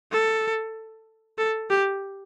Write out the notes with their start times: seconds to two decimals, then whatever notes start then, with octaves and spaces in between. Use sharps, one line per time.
0.12 A4
1.38 A4
1.70 G4